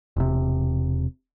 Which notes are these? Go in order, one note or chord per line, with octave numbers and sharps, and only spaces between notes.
E1 C3